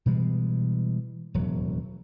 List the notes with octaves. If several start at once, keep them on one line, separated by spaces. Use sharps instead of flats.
B2 E3 G3 G#3
E1 D#2 A2 F#3